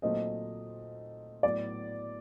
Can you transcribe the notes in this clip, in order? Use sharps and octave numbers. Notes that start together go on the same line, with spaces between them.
A#2 F#3 A3 C4 D#4 D#5
A2 F#3 B3 D5